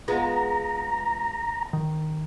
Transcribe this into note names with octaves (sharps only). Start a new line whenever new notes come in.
G#3 B3 F4 A#5
D#3